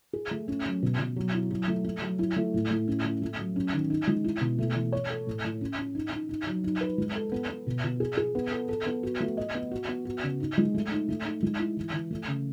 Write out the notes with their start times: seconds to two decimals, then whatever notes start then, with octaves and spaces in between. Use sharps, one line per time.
0.13 G#4
0.31 A3
0.48 C#4
0.66 F#3
0.82 B2
0.99 B2
1.16 F#3
1.34 E4
1.51 F#3
1.68 A3
1.84 A3
2.02 F#3
2.19 E4
2.36 A3
2.54 A2
2.71 A2
2.88 C#4
3.04 A3
3.22 A3
3.39 F#3
3.56 C#4
3.73 D#3
3.90 D#4
4.07 G#3
4.24 E4
4.41 B2
4.58 A3
4.75 E3
4.92 C#5
5.10 A4
5.27 A2
5.44 A2
5.61 C#4
5.79 C#4
5.95 D#4
6.13 D#4
6.29 D#4
6.47 F#3
6.64 D#4
6.81 B4
6.98 G#3
7.16 A4
7.32 B3
7.49 B3
7.67 B2
7.84 B2
8.00 G#4
8.17 G#4
8.35 B3
8.52 A4
8.69 A4
8.86 B3
9.03 F#4
9.20 A3
9.37 D#5
9.54 B3
9.71 F#4
9.88 B3
10.05 F#4
10.23 C#3
10.40 D#4
10.58 G#3
10.74 A3
10.91 D#4
11.09 A3
11.25 D#4
11.43 G#3
11.60 E4
11.77 E3
11.93 E3
12.11 A3
12.27 C#3